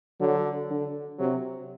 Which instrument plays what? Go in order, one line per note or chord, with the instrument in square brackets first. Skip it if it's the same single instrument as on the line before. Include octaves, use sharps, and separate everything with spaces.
[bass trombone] D3 [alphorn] F#3
[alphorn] D3
[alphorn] C3 [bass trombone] F#3